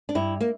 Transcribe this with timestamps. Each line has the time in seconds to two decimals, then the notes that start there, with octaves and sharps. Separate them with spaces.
0.09 D4
0.15 G2 E4
0.41 A#3